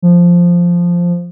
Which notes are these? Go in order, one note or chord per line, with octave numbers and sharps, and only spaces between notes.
F3